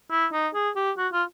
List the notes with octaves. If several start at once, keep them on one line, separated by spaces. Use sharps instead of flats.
E4
D#4
G#4
G4
F#4
F4